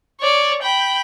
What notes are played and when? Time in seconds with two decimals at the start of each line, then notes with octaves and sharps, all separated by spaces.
0.21 C#5 D5
0.63 G5 B5